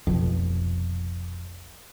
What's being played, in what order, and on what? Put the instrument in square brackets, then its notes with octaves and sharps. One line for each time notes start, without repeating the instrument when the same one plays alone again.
[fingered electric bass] F1 B1 F2